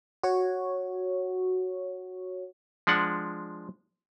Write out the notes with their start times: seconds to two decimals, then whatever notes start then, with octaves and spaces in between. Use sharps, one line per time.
0.23 F#4 C#5
2.87 F3 G#3 D4 F#5